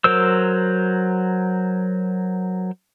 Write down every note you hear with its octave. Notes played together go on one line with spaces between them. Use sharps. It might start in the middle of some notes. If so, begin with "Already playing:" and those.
F#3 A#4 C5 E6